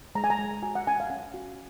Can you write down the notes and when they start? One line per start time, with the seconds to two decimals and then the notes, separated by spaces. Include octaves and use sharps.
0.15 G#3 A#5
0.24 G#5
0.30 A#5
0.39 G#3
0.62 F#4 G#5
0.75 F#5
0.87 C#4 G#5
1.00 F5
1.10 C#4 F#5
1.34 F#4